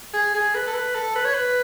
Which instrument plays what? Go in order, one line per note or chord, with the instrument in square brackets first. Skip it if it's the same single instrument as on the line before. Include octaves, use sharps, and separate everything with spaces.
[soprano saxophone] G#4
G#4
B4
A4
B4
A4
B4
C#5
B4